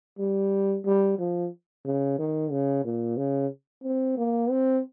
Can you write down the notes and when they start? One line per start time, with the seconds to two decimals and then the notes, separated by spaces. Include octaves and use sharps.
0.19 G3
0.85 G3
1.19 F3
1.85 C#3
2.19 D#3
2.51 C#3
2.85 A#2
3.17 C#3
3.83 C4
4.17 A#3
4.50 C4